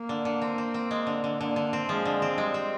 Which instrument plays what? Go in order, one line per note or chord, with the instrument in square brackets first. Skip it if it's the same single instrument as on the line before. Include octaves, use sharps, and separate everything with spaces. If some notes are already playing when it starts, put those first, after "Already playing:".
Already playing: [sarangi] A#3
[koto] D3
D3
C4
C4
C4
G#3
D3
D3
[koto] D3 [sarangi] A#3
[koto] D3
C4
[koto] F3 [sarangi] G#3
[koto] D3
C4
[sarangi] G3 [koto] G#3
[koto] C4